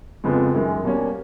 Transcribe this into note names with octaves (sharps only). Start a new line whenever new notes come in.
F2 C#3 F3 G#3 B3
F#2 D#3 G#3
B2 G3 A#3 C#4